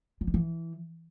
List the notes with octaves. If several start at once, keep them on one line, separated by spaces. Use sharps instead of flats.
G3
D#3
E3